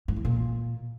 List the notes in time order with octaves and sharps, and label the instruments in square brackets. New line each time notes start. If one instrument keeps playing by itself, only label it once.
[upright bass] G2
E3
A#2